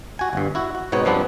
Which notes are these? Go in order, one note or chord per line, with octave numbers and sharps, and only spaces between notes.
F#4 G#5
G1 G2
E4 F#4
F#4
G#2 B2 B3 C4 D#4 C#5
G2 F3 B3 C4 D4 B4